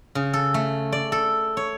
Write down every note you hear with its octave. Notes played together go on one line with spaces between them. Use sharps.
C#3
A4
A3
D5
A4
C#5